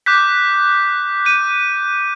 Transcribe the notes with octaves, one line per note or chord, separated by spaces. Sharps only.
D6 F#6 G6 B6
G6 D#7